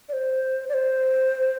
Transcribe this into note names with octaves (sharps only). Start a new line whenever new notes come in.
D5
C5
D5
C5